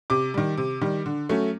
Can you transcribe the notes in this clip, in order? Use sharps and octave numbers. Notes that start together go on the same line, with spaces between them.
C3 D6
D#3 G3
C3
D#3 G3
D3
F#3 A3 C#4